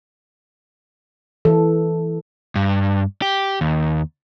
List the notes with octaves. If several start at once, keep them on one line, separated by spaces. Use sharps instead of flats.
E3 A4
G2
G4
D#2